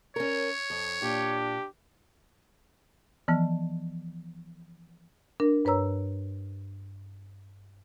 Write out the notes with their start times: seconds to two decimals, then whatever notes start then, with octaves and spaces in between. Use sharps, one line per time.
0.16 C#4 A#4 C#5
0.70 F2
1.02 A#2 D4 G4
3.28 E3 F3 B3
5.40 D4 A#4
5.65 G2 B4 C#5 A#5 E6